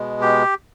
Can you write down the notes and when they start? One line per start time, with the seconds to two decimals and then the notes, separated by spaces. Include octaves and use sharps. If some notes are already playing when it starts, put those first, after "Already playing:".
Already playing: B2 G#3
0.21 G4